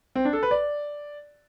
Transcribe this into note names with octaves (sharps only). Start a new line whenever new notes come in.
C4
D4
A4
B4
D5